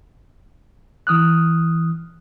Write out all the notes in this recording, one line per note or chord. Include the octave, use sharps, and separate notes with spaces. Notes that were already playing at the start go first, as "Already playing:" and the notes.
E3 D#6 F6 F#6